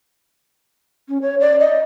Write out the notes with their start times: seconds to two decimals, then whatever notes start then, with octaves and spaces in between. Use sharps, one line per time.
1.08 C#4
1.22 C#5
1.40 D5
1.60 D#5